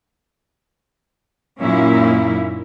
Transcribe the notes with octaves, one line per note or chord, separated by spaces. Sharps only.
F#2 A#2 A#3 C#4 D#4 E4